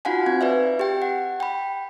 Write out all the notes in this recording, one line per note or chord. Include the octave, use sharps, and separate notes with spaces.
D#4 F4 F#4 F5 F#5 G#5
C4 G#6
B4 D5 E5
G4 G5
F#5
G5 B5